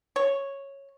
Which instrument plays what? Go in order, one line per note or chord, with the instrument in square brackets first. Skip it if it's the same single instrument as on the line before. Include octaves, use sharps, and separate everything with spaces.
[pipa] C#5